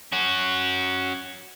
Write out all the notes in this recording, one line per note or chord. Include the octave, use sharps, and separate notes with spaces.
C#4 F#4